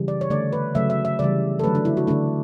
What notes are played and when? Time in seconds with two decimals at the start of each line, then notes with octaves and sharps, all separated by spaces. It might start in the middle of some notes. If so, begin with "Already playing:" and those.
Already playing: C#3 E3 G3
0.08 D5
0.21 C#5
0.30 D3 A3 D5
0.53 B4
0.75 C#3 F#3 A3 E5
0.90 E5
1.05 E5
1.19 C#3 E3 G3 D5
1.59 A4
1.64 D3 F#3 A3 B4
1.75 D4
1.85 E4
1.97 F#4
2.07 D3 A3 D4